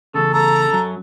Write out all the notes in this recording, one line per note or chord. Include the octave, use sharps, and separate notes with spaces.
E2 C#3 A4
A4 A#5
F#2 F#3